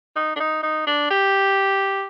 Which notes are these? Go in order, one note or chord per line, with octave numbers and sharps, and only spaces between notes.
D#4
D4
D#4
D#4
D4
G4